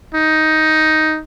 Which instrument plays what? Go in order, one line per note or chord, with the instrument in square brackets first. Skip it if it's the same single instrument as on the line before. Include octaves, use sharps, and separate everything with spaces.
[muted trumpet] D#4